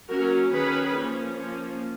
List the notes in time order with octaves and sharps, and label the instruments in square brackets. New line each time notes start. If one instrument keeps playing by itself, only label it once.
[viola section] F#3 A#3 C#4 F#4 A#4
D#3 F#3 C#4 G#4 B4
F3 A#3 C#4
F3 A#3 C#4